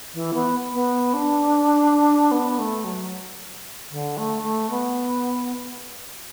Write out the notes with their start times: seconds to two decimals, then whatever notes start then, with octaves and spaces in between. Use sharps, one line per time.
0.14 E3
0.34 B3
0.73 B3
1.14 D4
2.31 B3
2.59 A3
2.84 F#3
3.91 D3
4.17 A3
4.43 A3
4.70 B3